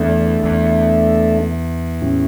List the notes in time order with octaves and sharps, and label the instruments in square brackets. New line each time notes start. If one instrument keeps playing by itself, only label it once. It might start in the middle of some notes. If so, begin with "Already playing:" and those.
Already playing: [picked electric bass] E2 [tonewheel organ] A3 D4 A4 E5
[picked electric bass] E2
[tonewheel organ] A2 G3 C#4 E4